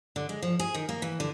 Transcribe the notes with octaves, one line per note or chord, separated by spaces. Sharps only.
D3
G#3
F3
G#4
D#3
A#3
E3
D3